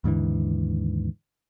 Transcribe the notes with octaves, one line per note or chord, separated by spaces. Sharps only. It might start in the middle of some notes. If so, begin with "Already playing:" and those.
D#2 G#2 D3 E3